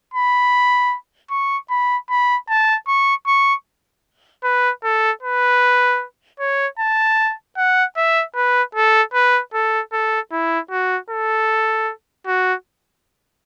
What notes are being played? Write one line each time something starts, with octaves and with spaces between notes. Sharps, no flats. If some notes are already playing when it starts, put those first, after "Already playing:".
B5
C#6
B5
B5
A5
C#6
C#6
B4
A4
B4
C#5
A5
F#5
E5
B4
A4
B4
A4
A4
E4
F#4
A4
F#4